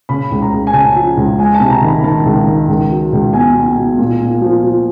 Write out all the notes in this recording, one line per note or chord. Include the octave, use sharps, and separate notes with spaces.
C#3 B5
C#2
A#5
C#2
G#5
C#3 A5
F3
C#2
G#3 G#5
A5
C3
A#5
D#3
B5
D#3 A5
C#2
D#3
C#2
F#3
C#2
B2 G#5
B2
B2
A#2
A#2
F3
F3